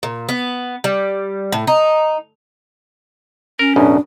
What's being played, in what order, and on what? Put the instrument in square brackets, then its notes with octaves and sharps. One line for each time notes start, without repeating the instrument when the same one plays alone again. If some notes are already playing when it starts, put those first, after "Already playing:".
[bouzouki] A#2
B3
G3
A2
D#4
[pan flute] C#4 [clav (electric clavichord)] A#4
[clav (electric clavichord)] A1 F#2 B2 [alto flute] D4